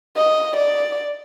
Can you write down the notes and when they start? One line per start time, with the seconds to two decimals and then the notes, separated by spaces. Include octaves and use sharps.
0.17 D#5
0.56 D5